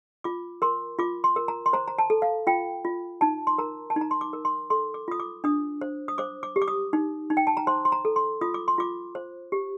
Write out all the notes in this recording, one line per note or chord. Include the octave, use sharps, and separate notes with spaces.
F4 D6
A#4 C6
F4 D6
C6
A#4
A#5
C6
C5 A#5
A#5
A5
A4
F5
F4 G5
F4
D#4 A5
C6
A#4 A#5
A5
D#4
A#5
C6
D6
A#4
C6
A4 C6
D6
F4 D#6
D6
D4 D#6
C5
D#6
C5 D6
D6
G4
D6
D#6
D#4
D#4
G5
A5
A#5
C5 C6
C6
A#5
A4
C6
F4 D#6
D6
C6
F4 D6
C5
G4